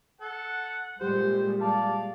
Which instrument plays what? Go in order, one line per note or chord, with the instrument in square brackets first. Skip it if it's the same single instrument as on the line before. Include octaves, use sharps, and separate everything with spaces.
[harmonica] A4 [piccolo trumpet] F#5
[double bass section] A#2 G3 G#3 [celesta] G4 [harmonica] C5
[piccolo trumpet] D5 [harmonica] F5 [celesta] A5